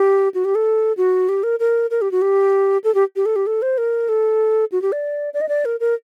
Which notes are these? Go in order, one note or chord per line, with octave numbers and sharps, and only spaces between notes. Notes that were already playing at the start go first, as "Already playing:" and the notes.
Already playing: G4
F#4
G4
A4
F#4
G4
A#4
A#4
A#4
G4
F#4
G4
A4
G4
G4
A4
G4
A4
C5
A#4
A4
F#4
G4
D5
D5
D#5
D5
A#4
A#4